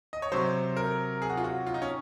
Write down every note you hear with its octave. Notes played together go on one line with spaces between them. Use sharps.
D#5
C#5
C3 F#3 C5
A#4
G#4
F#4
F4
F#4
F4
D#4
C#4